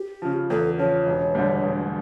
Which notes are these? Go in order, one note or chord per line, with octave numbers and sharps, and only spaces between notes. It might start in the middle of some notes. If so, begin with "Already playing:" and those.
Already playing: G4
C#3 F3
E2 A4
C#3 F3 C#5
E1
D2 D3 G3
E1